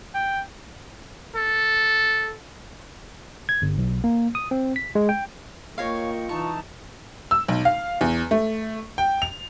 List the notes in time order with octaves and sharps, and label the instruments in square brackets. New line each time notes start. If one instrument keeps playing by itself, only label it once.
[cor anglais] G5
[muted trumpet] A4
[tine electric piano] G#6
G1
B1
A#3
D#6
C4
B6
G#3
G5
[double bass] A#3 [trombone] F4 [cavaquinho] C#5 F5 [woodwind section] D#5 G5 C#6
[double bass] E3 D#4 [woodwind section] A5 [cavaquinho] C#6
[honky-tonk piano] E6
B1
F5
E2
A3
G5
F7